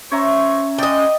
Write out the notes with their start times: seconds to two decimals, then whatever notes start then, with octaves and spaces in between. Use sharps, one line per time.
0.12 C#4 C5 C#5 E5 A#5 C#6
0.78 G#3 D5 D#5 G5